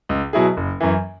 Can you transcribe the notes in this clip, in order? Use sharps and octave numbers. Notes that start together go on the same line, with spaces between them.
C#2
B2 F#3 E4 G#4
F#1
F#2 E3